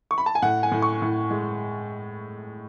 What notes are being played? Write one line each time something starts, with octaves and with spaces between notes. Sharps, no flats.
C#6
B5
A5
G#5
A2 F#5
G#5
A2
C#6
A2
G#3